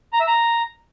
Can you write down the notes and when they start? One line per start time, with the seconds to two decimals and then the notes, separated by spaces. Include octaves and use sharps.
0.13 A#5
0.20 E5
0.27 A#5